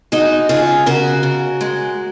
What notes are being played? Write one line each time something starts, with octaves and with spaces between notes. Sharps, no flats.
G#3 D#4 F#4
C#3 F4 G#4
C#3 F#4 A#4
C#3
G#3